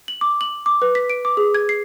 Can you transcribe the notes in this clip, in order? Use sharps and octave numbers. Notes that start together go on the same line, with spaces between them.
F#7
D6
F#7
D6
B4
B6
D7
D6
G#4
G#6
C7